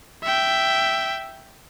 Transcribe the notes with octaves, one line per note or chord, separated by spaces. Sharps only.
E5 G5